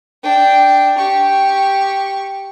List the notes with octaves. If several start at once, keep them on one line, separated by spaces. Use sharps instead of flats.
D4 G5
G4 C#6